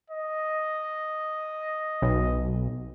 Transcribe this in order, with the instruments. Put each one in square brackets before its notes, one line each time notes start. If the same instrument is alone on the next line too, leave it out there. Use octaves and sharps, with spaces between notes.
[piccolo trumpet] D#5
[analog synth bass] B1